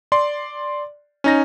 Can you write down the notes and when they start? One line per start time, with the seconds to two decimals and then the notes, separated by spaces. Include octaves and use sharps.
0.12 D5 C6
1.24 C#4 D#4 A#6